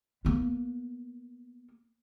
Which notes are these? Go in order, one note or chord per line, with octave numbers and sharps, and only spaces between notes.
A#3 B3